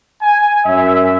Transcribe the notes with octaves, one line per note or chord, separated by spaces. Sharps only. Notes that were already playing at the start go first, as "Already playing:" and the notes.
G#5
F#2 E5